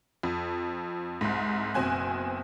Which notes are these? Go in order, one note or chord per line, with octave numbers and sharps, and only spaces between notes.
F2
C2 G#2
F#1 B2 C4 G#5 F#6